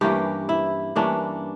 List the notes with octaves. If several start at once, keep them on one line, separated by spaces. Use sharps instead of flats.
G2 E3 A#3 C#4 G4
E4
G2 E3 A#3 C#4 D4